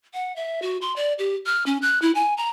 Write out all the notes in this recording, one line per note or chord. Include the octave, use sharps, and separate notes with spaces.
F#5
E5
F#4
C6
D5
G4
F6
C#4
F#6
E4
G#5
A#5